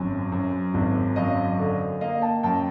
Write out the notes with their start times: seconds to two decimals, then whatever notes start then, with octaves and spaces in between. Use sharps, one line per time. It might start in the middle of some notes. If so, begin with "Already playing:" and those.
Already playing: G#1 F#2
0.32 F#2
0.74 G#1
1.16 F#2 D#5 F5
1.59 D3
2.01 A#3 D#5 F5
2.22 G5 A5
2.43 F#2 G5 A5